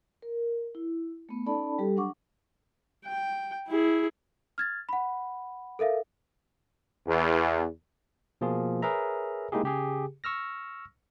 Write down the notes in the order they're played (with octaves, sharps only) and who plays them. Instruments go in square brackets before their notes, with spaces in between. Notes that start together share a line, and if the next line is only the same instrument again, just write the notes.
[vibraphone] A#4
E4
A3 B3
C#4 D#4 A4 D5 A5 B5
G3 G4 A4
F#3 D4 F#5 C#6 D6
[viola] G5
E4 G#4
[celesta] F6 G#6 A6
F#5 B5
A4 A#4 E5 F5
[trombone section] E2
[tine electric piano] B2 F3 A#3 F4 G#4
G#4 A#4 B4 C#5 E5 A#5
G#3 A#3 D#4 E4 G4 G#4
C#3 G4 G#4
C#6 E6 F6 A#6